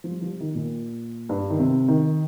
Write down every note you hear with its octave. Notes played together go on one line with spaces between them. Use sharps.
F3
G3
F3
G3
D#3
A#2
G2
D#3
C3
D#3